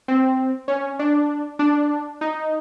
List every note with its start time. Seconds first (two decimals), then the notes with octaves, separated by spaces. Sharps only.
0.08 C4
0.68 C#4
0.99 D4
1.59 D4
2.21 D#4